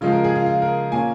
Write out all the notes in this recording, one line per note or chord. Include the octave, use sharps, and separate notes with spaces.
C#3 F3 G#3 F4
A#4
G#4
F4
F4
A#4
A#2 A#3 C#4 G#5